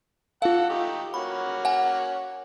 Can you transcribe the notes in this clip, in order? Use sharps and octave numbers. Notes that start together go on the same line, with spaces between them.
F4 A4 F5 F#5
A3 D#4 G4
A#3 C#4 F#4 B5
F#5 G#5